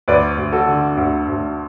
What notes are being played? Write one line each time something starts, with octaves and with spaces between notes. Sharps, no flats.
D2 B4 D5
D2
F#4 A4
D3
D2
D2